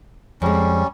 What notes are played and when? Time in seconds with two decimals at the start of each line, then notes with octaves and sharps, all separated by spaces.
0.42 F2 G3 G#3 C#4